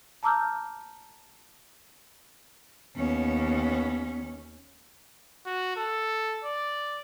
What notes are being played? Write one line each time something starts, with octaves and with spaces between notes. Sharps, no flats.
A5 A#5 D6 E6 F6 G6
D#2 B3 C#4
F#4
A4
D5